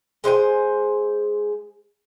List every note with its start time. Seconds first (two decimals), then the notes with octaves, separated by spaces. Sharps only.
0.24 G#3 C5 G5 G#5